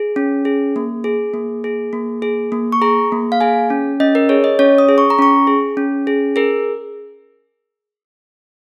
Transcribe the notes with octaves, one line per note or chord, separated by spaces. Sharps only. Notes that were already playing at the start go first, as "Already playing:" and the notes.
Already playing: G#4
C#4
G#4
A#3
G#4
A#3
G#4
A#3
G#4
A#3
C#6
G#4 A#5
A#3
F5
G#4 G#5
C#4
C#4 D#5
A#4
G#4 C#5
D#5
C#4 C#5
D#6
G#4
C#6
A#5
C#4 C#6
G#4
C#4
G#4
G#4 A#4